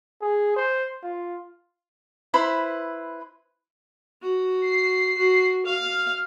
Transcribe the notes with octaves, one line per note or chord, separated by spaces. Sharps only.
G#4
C5
F4
E4 B4 C5 B5
F#4
C7
F#4
F5 F6